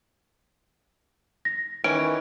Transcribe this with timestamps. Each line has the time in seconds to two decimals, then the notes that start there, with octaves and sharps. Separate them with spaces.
1.45 A#6
1.84 D#3 E3 C#4 D7